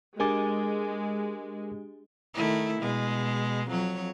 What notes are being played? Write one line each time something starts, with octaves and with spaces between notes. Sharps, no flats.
G#3 D4 G4 G#4 A#4 G#5 D6
D#3 A3 E4
B2 G#3
F2 F#3 C#5